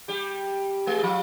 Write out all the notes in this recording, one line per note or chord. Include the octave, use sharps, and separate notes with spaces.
G3 G4
G#3 G#4
F3 F4